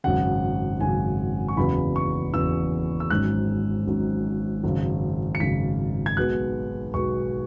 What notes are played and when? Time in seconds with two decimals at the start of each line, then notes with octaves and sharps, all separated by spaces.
0.04 G#1 F#2 C#3 F#5
0.81 G#1 F#2 C#3 G#5
1.48 C#6
1.57 F#1 E2 C#3 F#3 B3 B5
1.96 C#6
2.34 F#1 E2 C#3 F#3 B3 E6
3.00 E6
3.10 G#1 G#2 F#3 C#4 F#6
3.87 G#1 G#2 F#3 C#4
4.64 G#1 F#2 C#3
5.35 C#7
5.40 G#1 F#2 C#3 B6
6.06 G#6
6.17 B1 B2 G#3 B3 F#6
6.94 B1 B2 G#3 B3 C#6